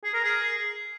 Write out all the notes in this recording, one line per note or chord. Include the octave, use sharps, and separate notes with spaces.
G#4
A#4
G#4